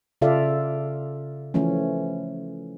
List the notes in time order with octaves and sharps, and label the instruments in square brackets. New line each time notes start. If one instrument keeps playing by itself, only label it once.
[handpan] C#3 F4 A4 D5 E5 F5
E3 F3 A3 C#4